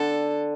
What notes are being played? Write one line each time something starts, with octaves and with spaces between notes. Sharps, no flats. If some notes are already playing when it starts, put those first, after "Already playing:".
Already playing: D3 A4